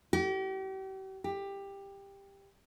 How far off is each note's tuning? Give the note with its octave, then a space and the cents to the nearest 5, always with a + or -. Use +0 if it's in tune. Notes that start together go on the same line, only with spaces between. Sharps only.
G4 -40
G4 +15